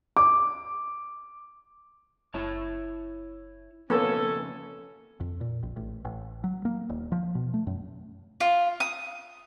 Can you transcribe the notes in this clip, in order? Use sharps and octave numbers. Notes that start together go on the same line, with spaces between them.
D6
F#1 E4 C#5 A5
F2 C#3 A#3 B3 C#4 A4
F2
A#2
A#1
A1
A1
F#3
A#3
D#1
F3
B2
A3
F#2
F4
D#6